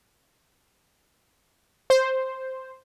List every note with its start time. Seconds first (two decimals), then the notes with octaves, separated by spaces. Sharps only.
1.90 C5